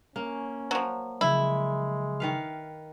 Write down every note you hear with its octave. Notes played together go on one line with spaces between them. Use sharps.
A#3 C#4
F3 F#3
C#3 F3 F#3 G#3 E4
D#3 B4 F5